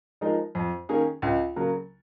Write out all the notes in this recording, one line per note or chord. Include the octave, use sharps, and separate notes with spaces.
F3 G#3 D#4 A#4
F2
D#3 A#3 C#4 G#4
C#2
C#3 F#3 A#3